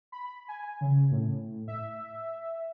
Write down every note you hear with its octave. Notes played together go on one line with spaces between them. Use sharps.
B5
G#5
C#3
A2
E5